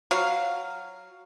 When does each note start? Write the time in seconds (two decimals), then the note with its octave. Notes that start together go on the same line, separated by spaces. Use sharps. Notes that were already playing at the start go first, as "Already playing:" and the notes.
0.11 F#3 F5